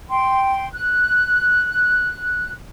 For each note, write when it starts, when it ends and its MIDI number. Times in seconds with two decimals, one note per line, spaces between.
0.10 0.68 79
0.10 0.68 84
0.73 2.52 90